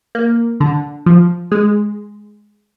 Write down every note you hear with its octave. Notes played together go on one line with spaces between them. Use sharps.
A#3
D3
F3
G#3